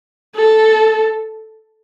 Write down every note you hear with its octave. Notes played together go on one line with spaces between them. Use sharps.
A4